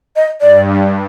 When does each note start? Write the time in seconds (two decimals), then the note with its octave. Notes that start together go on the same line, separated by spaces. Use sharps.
0.16 D#5
0.41 G2 D5